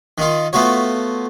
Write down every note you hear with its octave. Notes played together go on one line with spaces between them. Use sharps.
D#3 D#4 F4
A3 B3 F4 F#4 C#5